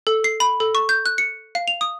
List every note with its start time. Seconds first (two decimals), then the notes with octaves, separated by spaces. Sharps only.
0.07 A4
0.24 C7
0.40 B5
0.60 A4
0.75 C#6
0.89 G6
1.06 F#6
1.18 C#7
1.55 F5
1.68 F7
1.81 D#6